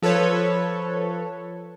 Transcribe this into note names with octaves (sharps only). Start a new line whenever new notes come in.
F3 A4 B4 C#5